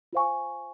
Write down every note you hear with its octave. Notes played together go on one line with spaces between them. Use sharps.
F4 C5 F5 G#5 C#6